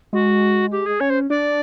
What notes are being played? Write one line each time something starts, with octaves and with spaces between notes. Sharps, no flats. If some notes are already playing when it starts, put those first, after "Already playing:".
G#3 F#4
G4
G#4
C#4 C#5
C5
D4 D5